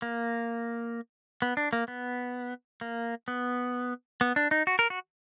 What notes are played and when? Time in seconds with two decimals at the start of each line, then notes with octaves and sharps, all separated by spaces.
0.02 A#3
1.42 B3
1.57 D4
1.73 A#3
1.88 B3
2.81 A#3
3.28 B3
4.21 B3
4.36 D4
4.51 D#4
4.67 F#4
4.79 A#4
4.90 F#4